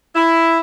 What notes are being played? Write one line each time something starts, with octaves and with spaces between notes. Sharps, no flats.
E4